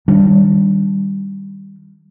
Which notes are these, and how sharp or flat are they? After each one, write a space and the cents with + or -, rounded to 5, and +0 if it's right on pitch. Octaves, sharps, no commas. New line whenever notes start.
D#3 +0 G3 +0 D4 +0